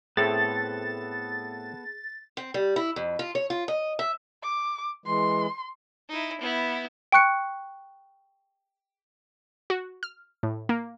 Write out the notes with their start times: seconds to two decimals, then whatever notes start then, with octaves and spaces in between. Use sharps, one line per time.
0.17 A2 B3 C4 E4 G#4 A4 A6
2.37 C4
2.54 G3
2.76 E4
2.96 F2
3.19 F4
3.35 C#5
3.50 F4
3.68 D#5
3.99 E5
4.43 D6
5.06 E3 G#3 C6
6.09 D#4 E4
6.41 B3 E4
7.12 G5 C#6 F#6 C#7
9.70 F#4
10.03 F6
10.43 A2
10.69 A#3